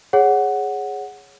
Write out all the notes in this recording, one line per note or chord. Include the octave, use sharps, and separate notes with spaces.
G#4 C#5 F#5